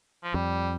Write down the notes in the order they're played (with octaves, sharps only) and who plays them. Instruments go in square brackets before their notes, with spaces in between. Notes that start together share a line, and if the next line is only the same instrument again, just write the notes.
[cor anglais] F3
[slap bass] F2 [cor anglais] G3